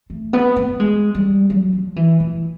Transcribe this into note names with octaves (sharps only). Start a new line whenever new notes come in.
A3
B3
B3
G#3
G3
F#3
F3
E3
E3